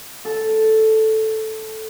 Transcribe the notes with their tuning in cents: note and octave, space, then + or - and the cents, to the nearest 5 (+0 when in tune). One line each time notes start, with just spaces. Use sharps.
A4 -5